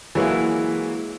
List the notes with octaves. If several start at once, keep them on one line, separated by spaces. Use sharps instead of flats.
E3 F#3 G#3 A#3 E4